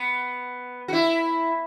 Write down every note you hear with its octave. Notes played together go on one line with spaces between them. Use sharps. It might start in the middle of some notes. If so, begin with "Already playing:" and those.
Already playing: B3
F#4
E4